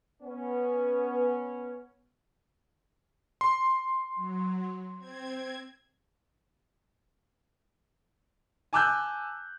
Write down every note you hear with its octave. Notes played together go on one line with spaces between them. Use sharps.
B3 C#4
C6
F#3
C4 G#6
G#5 A5 D6 E6 F#6 G6